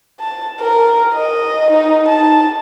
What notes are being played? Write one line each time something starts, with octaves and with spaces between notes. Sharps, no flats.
A5
A#4
D#5
D#4
A5